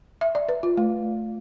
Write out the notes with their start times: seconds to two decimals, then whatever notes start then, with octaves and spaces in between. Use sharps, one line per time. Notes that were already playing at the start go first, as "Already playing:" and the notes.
0.21 E5
0.35 D5
0.49 B4
0.63 F4
0.77 A3